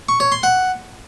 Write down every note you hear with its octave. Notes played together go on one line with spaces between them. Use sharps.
C#6
C#5
C6
F#5